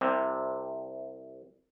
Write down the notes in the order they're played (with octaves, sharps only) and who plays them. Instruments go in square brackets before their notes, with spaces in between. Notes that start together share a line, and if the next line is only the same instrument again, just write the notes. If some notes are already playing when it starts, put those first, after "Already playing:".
[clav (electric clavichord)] C2 C3